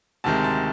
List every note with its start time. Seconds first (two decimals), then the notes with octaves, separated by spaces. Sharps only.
0.24 D2 C3 D#3 G#3 A5
0.44 A5